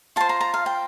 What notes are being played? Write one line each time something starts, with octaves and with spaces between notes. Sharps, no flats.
F4 C5 A5
A#5
A#5
F5
G5